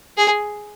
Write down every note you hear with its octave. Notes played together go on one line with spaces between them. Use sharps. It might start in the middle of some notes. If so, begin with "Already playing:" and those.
G#4